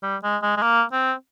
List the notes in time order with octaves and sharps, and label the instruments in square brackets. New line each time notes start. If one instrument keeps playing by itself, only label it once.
[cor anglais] G3
G#3
G#3
G#3
A#3
C4